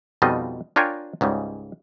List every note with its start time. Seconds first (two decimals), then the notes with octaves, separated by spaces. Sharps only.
0.22 F2 B2 G3 D#4 F4 D#5
0.76 D4 F4 A#4 C#5 G5 G#5
1.21 C#2 G#2 C#3 G3